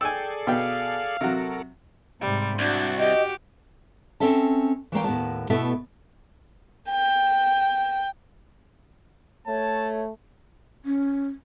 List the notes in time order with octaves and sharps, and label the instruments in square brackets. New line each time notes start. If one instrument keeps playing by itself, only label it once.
[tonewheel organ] G#4 A4 D5 [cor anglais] G5 [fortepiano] G#5 E6
[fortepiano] B2 G5 [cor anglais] F5
[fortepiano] C3 F#3 [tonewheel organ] F#4 A4 A#4
[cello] G#2 C3 [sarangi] G3
[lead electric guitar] C2 [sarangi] D4 [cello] F#4
[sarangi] G4 [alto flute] D#5
[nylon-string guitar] C4 C#4 A4 E5 A5
E3 A3 A#3 G5
D#2 A2 B3 A5
B2 A3 B3 E4 A4 E5
[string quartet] G5
[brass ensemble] A3 [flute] C#5 [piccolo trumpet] A5
[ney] C#4